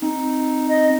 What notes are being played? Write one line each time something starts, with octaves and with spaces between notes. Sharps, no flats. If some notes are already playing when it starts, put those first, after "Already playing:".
C4 D#4
D#5